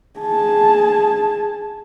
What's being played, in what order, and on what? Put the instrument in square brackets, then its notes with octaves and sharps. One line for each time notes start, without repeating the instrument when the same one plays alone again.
[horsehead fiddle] G#4 A5